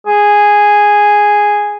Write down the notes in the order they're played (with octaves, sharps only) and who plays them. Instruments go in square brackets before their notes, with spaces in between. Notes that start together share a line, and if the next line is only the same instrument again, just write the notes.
[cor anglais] G#4